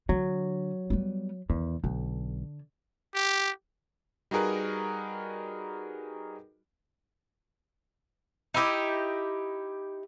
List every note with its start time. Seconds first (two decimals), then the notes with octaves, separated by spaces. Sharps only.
0.09 D3 F#3
0.90 G3 B3
1.50 E2 D#3
1.84 B1 D3
3.15 G4
4.31 G3 D#4 F#4 G#4 A#4 B4
8.54 D#4 E4 G4 D#5